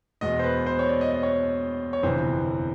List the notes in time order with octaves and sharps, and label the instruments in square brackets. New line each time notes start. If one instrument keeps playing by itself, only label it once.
[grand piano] E2 B2 G#3 D#5
C5
B4
C5
C#5
D5
D#5
D#5
C#5
C#5
G1 F2 C3 E3 C5